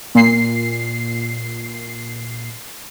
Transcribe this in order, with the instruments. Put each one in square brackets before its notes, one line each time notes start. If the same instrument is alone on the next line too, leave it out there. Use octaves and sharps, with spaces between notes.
[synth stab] A#2 C7